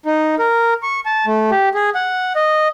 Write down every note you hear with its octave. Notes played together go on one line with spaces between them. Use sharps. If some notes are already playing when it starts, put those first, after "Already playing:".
D#4
A#4
C#6
A5
A3
G4
G#4
F#5
D#5